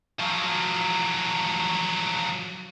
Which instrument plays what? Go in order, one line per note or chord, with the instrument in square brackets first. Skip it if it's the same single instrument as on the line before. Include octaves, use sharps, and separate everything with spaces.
[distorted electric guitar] F3 F#3